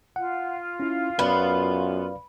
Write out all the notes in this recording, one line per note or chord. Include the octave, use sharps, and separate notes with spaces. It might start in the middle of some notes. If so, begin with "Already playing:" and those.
F4 F#5
C#4 E4
F#2 B3 B4 D5 F5